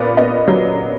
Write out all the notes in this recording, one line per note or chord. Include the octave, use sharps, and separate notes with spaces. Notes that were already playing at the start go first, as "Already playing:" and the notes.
Already playing: A#2 B3 B4 D5
B3 D#5
F#3